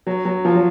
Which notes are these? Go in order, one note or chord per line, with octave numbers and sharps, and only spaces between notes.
F#3
F#3
F3
F#3